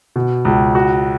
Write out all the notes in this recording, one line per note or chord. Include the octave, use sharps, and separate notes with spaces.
B2
C#2
F#4